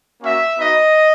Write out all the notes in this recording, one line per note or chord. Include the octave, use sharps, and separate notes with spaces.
A#3 C#4 F#4 E5
B3 D#4 F#4 D#5